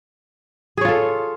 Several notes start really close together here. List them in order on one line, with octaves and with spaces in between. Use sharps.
G#4 C#5 F4 A4